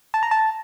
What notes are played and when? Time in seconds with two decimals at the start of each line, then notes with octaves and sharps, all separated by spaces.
0.14 A5
0.23 A#5
0.31 A5